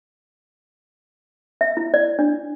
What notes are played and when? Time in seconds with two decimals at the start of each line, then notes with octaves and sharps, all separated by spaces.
1.61 E5
1.77 E4
1.94 D5
2.19 D4